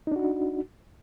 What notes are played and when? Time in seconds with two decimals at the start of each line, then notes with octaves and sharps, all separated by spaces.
0.07 D#4
0.12 D4
0.16 F#4